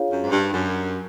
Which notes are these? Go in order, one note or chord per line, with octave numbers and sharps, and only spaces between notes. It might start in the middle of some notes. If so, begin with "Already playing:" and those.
Already playing: D4 F4 G#4 C#5 F5
F#2
G#2
G2
F#2